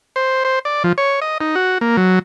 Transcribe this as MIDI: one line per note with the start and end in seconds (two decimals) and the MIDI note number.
0.16 0.43 72
0.45 0.59 72
0.65 0.83 74
0.84 0.93 53
0.98 1.20 73
1.22 1.38 75
1.41 1.55 63
1.55 1.78 66
1.81 1.97 58
1.97 2.19 54